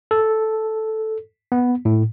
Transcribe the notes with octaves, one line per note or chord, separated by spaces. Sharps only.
A4
B3
A2